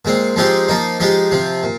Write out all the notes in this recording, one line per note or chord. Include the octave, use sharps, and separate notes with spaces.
A#2 G#3 C4
F3 G#3 C4 D#4 G4
F3 A#3 D#4
F3 G#3 D#4 G4
C3 F3 C4
A#2